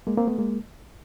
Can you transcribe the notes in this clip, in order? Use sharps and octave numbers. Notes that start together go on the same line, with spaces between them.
G#3 A#3
A#3 C4
A3 B3
G#3 A#3